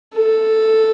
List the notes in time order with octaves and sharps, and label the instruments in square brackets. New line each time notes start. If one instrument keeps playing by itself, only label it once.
[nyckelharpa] A4